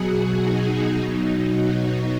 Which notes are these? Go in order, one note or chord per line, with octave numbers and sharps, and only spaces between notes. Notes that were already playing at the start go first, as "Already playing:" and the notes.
Already playing: B2 F#3 F#4 G#4
D#4
B2 F#3 D#4
F#4